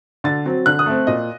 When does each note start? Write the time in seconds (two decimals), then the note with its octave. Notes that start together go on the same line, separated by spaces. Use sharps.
0.24 D3 A6
0.45 F#3 C4
0.66 D3 F#6
0.79 D#6
0.86 A3 C4
1.07 A#2 D#5